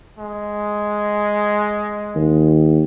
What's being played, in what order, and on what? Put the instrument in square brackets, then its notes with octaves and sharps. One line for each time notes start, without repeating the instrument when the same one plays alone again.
[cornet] G#3
[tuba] D#2